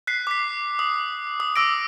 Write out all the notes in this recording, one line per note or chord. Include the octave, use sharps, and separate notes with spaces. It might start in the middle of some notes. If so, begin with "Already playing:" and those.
F#6 B6 C7
D6 B6
D#6
D#6
D6 E6 A#6 D7